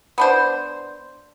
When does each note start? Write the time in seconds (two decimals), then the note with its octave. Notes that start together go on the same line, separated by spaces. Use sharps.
0.18 B3 D4 C5